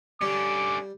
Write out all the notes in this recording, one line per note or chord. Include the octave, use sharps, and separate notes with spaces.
D3 G3 C#4 D6